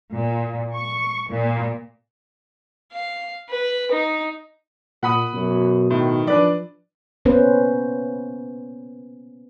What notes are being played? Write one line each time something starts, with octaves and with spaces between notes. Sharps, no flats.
A#2
C#6
A#2
F5
B4
D#4
A#2 F#5 B5 D#6
F#2 B2
A2 D#3
F3 D4 B4 D5
A#3 B3 C#4 B4 C5